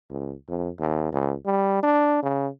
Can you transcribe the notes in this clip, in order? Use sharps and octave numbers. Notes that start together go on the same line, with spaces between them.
C#2
F2
D#2
C#2
G3
D4
C#3